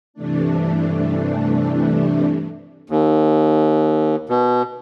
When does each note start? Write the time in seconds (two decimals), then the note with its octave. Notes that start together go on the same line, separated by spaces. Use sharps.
0.14 G2 C3 E3 A3 D4
2.90 D#2
4.29 B2